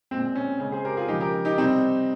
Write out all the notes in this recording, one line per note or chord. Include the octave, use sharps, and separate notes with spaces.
A#2 G#3 C4
C#4
C#3 G#3 C#4
G#4 C5
G4 A#4
F4 G#4
C#3 F3 G#3 D#4 G4
G4 A#4
D#4 G4
C3 G3 C4 D#4